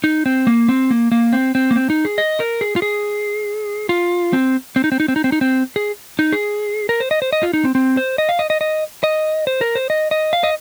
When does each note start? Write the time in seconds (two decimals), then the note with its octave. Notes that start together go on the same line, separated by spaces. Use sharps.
0.04 D#4
0.26 C4
0.47 A#3
0.68 C4
0.91 A#3
1.12 A#3
1.33 C4
1.55 C4
1.71 A#3
1.76 C4
1.90 D#4
2.05 G#4
2.18 D#5
2.40 A#4
2.61 G#4
2.76 F4
2.82 G#4
3.89 F4
4.33 C4
4.76 C4
4.84 D#4
4.92 C4
5.00 D#4
5.08 C4
5.16 D#4
5.24 C4
5.32 D#4
5.41 C4
5.76 G#4
6.19 D#4
6.33 G#4
6.89 A#4
7.00 C5
7.11 D#5
7.22 C5
7.33 D#5
7.43 F4
7.53 D#4
7.65 C4
7.75 C4
7.97 C5
8.18 D#5
8.29 F5
8.39 D#5
8.50 D#5
8.61 D#5
9.04 D#5
9.47 C5
9.61 A#4
9.75 C5
9.90 D#5
10.11 D#5
10.33 F5
10.44 D#5